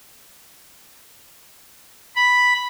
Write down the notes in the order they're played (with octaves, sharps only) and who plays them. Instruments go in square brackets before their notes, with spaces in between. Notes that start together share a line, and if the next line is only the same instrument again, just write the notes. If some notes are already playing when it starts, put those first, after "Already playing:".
[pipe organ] B5